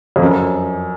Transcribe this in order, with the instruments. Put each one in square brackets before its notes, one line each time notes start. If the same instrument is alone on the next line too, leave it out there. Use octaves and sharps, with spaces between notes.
[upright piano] F2
F#2